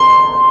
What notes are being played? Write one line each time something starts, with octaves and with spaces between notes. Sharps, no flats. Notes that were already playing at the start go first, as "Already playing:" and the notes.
Already playing: C6